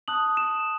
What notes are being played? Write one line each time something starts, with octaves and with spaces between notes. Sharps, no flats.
A5 D#6 F#6 F#7
E7